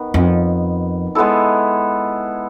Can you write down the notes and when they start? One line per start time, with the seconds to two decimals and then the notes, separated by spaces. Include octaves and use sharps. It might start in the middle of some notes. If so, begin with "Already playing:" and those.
Already playing: D#3 B3
0.14 F2
1.15 G#3 B3 E4 A4